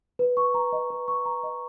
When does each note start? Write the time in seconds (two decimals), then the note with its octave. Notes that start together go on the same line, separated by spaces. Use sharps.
0.19 B4
0.37 C#6
0.54 A#5
0.72 D#5
0.90 B4
1.08 C#6
1.25 A#5
1.43 D#5